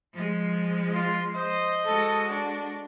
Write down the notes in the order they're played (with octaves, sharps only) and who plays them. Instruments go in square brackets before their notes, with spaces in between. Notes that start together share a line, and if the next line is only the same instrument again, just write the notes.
[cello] F3 G#3
[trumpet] F4 [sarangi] C6
[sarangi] C5 [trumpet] D#5
[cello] G#3 F#4 [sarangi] A4
[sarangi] D4